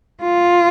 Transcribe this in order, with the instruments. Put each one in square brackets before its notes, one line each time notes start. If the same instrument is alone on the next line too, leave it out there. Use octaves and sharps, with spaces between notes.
[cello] F4